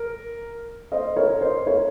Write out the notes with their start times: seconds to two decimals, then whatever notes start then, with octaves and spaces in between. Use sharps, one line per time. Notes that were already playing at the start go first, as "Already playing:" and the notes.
Already playing: A#4
0.92 C5 D#5
1.16 A#4 C#5
1.41 C5 D#5
1.66 A#4 C#5